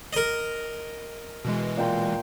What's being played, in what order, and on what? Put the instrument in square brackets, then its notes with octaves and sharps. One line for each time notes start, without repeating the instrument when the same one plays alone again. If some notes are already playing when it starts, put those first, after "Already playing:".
[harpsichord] A#4 D#5
[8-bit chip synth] B2 E3 G#3
[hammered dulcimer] A#2 G5 C6